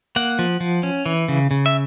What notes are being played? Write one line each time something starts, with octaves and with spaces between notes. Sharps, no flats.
A#3 F#5
F3
F3
C#4
E3
C#3
C#3
E5